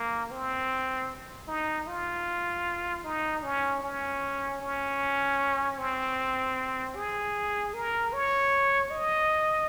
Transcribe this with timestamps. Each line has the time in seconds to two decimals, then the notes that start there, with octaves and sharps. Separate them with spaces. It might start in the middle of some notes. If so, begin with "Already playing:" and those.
Already playing: A#3
0.31 C4
1.48 D#4
1.87 F4
3.04 D#4
3.43 C#4
3.83 C#4
4.61 C#4
5.78 C4
6.96 G#4
7.74 A#4
8.13 C#5
8.90 D#5